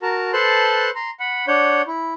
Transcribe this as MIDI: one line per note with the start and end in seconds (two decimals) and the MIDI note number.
0.02 0.32 66
0.02 0.32 70
0.02 0.32 81
0.02 0.32 82
0.33 0.90 69
0.33 0.90 71
0.33 0.90 72
0.33 0.90 81
0.33 0.90 84
0.33 0.90 90
0.95 1.10 82
0.95 1.10 84
1.20 1.46 78
1.20 1.46 83
1.48 1.82 62
1.48 1.82 73
1.48 1.82 78
1.48 1.82 91
1.87 2.14 64